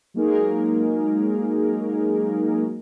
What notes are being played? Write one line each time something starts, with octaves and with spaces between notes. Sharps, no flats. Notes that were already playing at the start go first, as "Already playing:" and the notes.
F#3 G#3 A#3 D#4 G#4 A#4